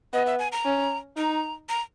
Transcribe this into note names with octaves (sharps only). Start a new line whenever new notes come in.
B3 D#5
E5
G#5
A#5
C#4
D#4 A#5
A#5